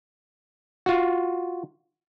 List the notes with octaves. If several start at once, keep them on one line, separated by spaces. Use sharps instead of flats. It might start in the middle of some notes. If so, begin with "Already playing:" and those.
F4 F#4